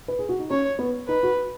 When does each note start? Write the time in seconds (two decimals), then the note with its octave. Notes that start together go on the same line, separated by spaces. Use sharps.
0.08 B4
0.19 G#4
0.29 F#4
0.39 D#4
0.51 C#4 C#5
0.79 B3
1.07 D#4 B4
1.23 F#4